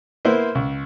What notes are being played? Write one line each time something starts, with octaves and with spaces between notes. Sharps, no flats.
A#3 B3 E4 C5
C#2